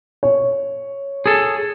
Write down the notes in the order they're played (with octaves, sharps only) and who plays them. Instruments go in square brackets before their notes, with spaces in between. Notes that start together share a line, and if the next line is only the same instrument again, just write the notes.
[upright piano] C#5
[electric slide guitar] G#4 A4